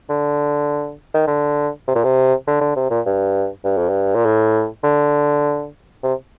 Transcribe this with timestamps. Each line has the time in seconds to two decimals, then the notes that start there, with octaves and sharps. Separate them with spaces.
0.10 D3
1.14 D#3
1.27 D3
1.88 C3
1.95 A#2
2.04 C3
2.47 D3
2.61 D3
2.76 C3
2.91 A#2
3.06 G2
3.65 G2
3.78 F2
3.89 G2
4.15 A#2
4.25 A2
4.84 D3
6.03 C3